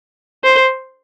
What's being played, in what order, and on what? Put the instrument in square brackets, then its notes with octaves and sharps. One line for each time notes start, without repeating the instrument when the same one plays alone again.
[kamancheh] C5